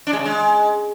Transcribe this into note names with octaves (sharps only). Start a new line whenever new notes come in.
D4
G#3
C#3
G#3